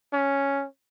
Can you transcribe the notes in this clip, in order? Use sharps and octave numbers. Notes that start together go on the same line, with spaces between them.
C#4